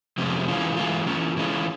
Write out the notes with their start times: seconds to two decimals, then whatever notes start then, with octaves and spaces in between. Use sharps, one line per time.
0.18 F2 C3 F3 G#3 C#4
0.48 E3 G#3 C#4 F4
0.77 E3 G#3 C#4 F4
1.07 E3 G#3 C#4 F4
1.37 E3 G#3 C#4 F4